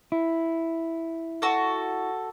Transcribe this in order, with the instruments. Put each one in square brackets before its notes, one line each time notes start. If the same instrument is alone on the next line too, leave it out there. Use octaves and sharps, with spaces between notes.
[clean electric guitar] E4
[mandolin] F#4 A4